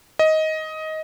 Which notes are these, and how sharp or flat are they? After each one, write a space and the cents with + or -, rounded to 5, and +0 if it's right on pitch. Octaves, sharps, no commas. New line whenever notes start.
D#5 +15